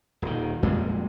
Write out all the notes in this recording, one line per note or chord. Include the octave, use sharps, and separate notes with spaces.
D#1 D#3
F2 A#2 G3 G#3